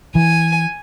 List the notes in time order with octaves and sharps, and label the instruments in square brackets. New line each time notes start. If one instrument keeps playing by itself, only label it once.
[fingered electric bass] E3 [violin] G#5